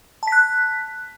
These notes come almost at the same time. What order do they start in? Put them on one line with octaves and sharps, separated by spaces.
A5 B6 F#6